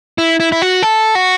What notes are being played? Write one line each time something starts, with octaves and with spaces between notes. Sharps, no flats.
E4
E4
E4
F#4
A4
F#4